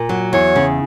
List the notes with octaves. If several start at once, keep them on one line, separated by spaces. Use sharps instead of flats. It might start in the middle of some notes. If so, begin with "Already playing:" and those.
Already playing: A#2
F#3
E2 C#5
C#3